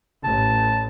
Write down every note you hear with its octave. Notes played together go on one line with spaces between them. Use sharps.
A1 A5